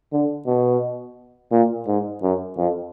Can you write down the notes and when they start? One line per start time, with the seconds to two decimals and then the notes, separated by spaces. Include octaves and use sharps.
0.12 D3
0.47 B2
1.51 A#2
1.87 G#2
2.23 F#2
2.57 F2